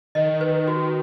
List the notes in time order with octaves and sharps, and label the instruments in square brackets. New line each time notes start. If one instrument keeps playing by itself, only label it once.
[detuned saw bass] D#3 [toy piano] D#5
[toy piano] B4
F#4